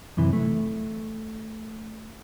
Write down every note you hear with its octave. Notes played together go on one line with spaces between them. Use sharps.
F#2 C3 E3
A3